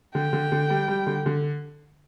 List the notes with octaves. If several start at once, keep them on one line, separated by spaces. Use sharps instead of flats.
D3 G5
D3
D3
G3
G3
D3
D3